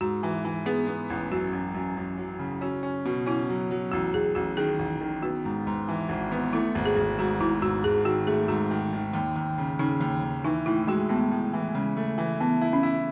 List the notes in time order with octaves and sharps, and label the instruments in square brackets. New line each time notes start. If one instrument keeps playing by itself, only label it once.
[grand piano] G#2 [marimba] F#4
[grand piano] E3
E3
[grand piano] B3 [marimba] G#4
[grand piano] B3
A1
[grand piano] F#2 [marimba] F#4
[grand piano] F#2
F#2
F#2
F#3
C#3
[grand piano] C#4 [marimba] F#4
[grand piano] C#4
B2
[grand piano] C#4 [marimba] E4
[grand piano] F#3
F#3
[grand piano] A1 [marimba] F#4
[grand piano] A1 [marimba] G#4
[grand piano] A1 [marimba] F#4
[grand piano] D#3 [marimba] G#4
[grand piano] A1
D#3
[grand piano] B3 [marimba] F#4
[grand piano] G#2
G#2
E3
G#1
B3
[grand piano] A3 [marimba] E4
[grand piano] G#1
[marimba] G#4
[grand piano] G#1
[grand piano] G#2 [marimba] F#4
[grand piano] G#2 [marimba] E4
[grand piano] G#2 [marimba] F#4
[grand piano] G#1 [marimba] G#4
[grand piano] D#3 [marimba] F#4
[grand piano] A3 [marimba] G#4
[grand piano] G#2 [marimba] F#4
[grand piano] D#3
D#3
D#2
D#2
C#3
[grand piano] C#3 [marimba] D#4
[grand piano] D#2
D#2
[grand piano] E3 [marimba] D#4
[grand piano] A2 [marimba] E4
[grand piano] G#3 [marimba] F#4
[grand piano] A2 [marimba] B3
[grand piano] A2
E3
[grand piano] C#3 [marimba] G#3
[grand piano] A3
E3
[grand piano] E3 [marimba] B3
[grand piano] E4
[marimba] C#4
[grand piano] E4